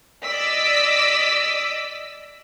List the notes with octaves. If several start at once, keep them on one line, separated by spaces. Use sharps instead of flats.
D5 D#5 D6 E6 B6